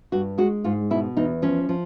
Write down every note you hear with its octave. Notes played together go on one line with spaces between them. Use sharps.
G2 F#4
G#3 F#4
G#2 F4
B2 E4
E2 D#4
F3 C#4
F3